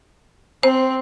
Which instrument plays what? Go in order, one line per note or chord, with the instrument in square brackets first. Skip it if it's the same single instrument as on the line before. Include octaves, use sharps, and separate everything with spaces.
[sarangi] C4 [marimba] C5